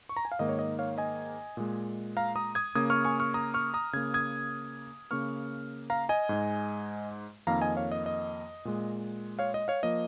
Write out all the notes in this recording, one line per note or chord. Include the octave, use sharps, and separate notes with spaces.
C#6
A#5
G#5
F5
G#2 D#3 A#3 D#5
C#5
D#5
C#5 F5
D#5 G#5
A#2 G#3
F5 A#5
A#5 D#6
D#6 G#6
C#3 A#3 D#6 G#6
C#6 F6
G#5 C#6
C#6 F6
A#5 D#6
C#6 F6
A#5 D#6
C#3 A#3 G#6
D#6 G#6
C#3 A#3 C#6 F6
F5 A#5
D#5 G#5
G#2 G#3
F2 D#3 A#3 F5 A#5
D#5 G#5
C#5 F5
D#5
D#5
A#2 G#3
C#5 F5
D#5
C#5 F5
F3 A#3 D#5